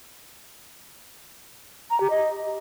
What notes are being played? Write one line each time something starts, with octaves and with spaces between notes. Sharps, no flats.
A#5
G4
D#5